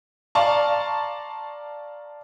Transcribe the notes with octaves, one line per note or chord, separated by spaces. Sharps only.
D5 F5 A5 A#5 C6 C#6